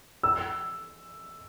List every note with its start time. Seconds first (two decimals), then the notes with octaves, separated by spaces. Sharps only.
0.23 E6